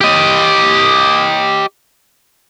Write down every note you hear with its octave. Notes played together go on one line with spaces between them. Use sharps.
G4 D#5